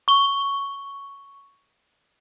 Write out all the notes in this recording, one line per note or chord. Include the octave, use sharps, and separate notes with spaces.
C#6 G7